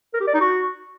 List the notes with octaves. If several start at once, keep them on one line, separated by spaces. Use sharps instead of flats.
A#4
G4
D5
D#4
F#4